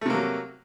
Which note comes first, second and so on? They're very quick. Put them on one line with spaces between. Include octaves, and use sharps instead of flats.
A3 C3 A#3 F#3